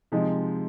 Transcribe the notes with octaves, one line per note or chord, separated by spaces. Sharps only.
C3 F3 G#3 D#4